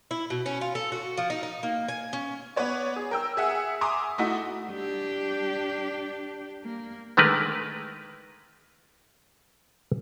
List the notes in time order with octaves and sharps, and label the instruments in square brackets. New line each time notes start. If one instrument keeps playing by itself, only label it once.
[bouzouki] E4
B2
C#4
F4
A4
F#4
F3
D#4
D#4
A#3
G#5
C#4
[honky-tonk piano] B3 B4 C#5 D5
G#4
A#4 G5 E6
G#4 E5 F#5 G#5
E5 G#5 A#5 C6 D6 D#6
A3 D#4 E4 F#4
[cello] D4 G4
A#3
[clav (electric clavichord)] D3 D#3 G#3 A3 A#4 B4